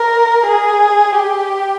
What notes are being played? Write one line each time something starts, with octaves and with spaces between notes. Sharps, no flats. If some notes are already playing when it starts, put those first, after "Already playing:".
Already playing: A#4
G#4
G4